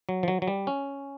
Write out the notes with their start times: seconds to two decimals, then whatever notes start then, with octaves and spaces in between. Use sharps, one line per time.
0.09 F#3
0.23 F3
0.28 F#3
0.42 F#3
0.48 G3
0.67 C#4